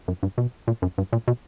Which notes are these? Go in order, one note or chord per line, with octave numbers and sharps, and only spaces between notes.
F#2
G2
B2
A#2
F#2
G2
A#2
B2